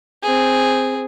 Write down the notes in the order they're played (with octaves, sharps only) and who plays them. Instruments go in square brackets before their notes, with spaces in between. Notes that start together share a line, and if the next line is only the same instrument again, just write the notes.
[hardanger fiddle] C4 G#4